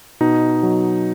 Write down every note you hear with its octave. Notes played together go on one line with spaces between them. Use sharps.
B2 D#4
F#3